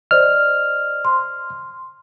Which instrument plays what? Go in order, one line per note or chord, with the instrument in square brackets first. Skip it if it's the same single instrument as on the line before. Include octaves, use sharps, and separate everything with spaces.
[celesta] C5 D5 D#5 [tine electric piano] F6
[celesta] C6